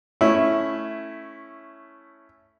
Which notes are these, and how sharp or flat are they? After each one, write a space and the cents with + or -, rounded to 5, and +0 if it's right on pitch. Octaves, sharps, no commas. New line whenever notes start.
A3 +0 C#4 +0 E4 +0